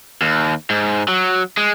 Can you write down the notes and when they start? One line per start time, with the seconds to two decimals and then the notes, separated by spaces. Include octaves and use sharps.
0.22 D#2
0.70 G#2
1.08 F#3
1.57 G#3